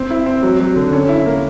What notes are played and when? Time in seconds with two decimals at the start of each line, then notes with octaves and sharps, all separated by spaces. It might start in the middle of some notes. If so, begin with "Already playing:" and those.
Already playing: C4
0.10 E4
0.26 C4
0.43 F#3
0.60 F#3
0.76 D3
0.93 C#4
1.09 E4
1.26 A#3